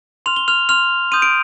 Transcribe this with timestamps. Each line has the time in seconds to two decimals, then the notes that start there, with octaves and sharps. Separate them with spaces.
0.26 C6 F6 F7
0.36 G7
0.48 F6 F7
0.69 C6 F6 F7
1.12 C6 D#6 G6 D#7
1.22 D7